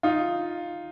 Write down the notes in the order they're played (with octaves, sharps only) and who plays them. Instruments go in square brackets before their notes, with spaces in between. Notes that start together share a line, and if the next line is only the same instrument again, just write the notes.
[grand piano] D#4 F4